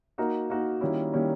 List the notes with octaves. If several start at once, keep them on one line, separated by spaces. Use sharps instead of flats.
A#3 D#4 F#4 A#4
A#3 D#4 F#4 A#4
D#3 G3 A#3 C#4 E4
D#3 G3 A#3 C#4 E4